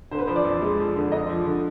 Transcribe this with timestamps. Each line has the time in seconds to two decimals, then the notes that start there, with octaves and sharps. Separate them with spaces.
0.11 D3 C5
0.19 B4
0.27 F3 C5
0.36 D5
0.45 F2
0.62 G#3
0.78 F3
0.96 D3
1.12 D3 D#5
1.29 F3
1.46 D3